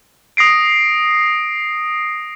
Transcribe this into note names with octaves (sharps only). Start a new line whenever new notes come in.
D#6 A#6 C7 D7